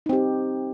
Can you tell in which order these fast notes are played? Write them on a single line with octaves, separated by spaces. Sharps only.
D#4 C4 G4